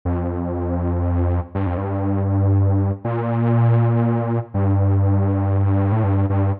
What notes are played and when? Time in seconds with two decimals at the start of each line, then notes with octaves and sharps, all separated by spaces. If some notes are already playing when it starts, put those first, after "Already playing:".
0.05 F2
1.55 G2
1.66 F2
1.77 G2
3.04 A#2
4.54 G2
5.92 A2
6.04 G2
6.30 G2